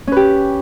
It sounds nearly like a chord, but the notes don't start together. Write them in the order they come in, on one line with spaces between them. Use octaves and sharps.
C#4 B4 G4